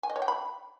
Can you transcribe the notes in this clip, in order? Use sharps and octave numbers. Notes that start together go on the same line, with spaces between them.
G#5
D#5
C#5
G5
B5